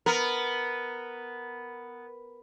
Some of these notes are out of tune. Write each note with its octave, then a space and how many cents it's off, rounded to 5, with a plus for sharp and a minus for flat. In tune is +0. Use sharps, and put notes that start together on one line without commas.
B3 +0 A#4 +0